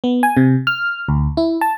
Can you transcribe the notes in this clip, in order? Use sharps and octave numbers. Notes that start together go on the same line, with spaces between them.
B3
G#5
C3
F6
D2
E4
A5